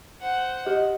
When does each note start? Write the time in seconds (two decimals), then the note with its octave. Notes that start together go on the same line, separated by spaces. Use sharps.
0.22 C5 F#5
0.67 G4 D#5